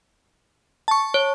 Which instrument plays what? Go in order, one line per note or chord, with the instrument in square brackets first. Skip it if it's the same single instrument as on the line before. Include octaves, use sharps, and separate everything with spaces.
[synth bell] A5 C#6
[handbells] C#5